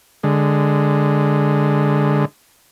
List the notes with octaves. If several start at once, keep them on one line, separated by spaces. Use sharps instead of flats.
D3 G#3